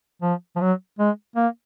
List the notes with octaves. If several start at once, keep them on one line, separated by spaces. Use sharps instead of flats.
F3
F3
F#3
G#3
A#3